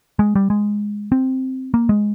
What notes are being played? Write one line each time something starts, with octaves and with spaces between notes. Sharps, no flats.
G#3
G3
G#3
C4
A#3
G#3